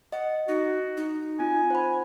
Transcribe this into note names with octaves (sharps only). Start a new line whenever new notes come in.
D#5 F#5
D#4 F#4
D#4
C4 F4 G#5
C5 F#5 B5